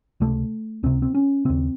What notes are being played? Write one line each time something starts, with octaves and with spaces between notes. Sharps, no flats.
C#2 C3 A3
C#2 C3 C4
C4
C#4
D#2 C#3 C4